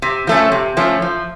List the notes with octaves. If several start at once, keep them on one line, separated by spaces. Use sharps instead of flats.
C3
F3 A3 C#4
C3
F3 A3 C#4
F3